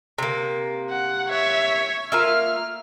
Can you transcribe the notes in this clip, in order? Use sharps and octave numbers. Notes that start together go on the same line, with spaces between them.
C3 A#3
F#5
C#5 E5
A#3 F4 E5 F6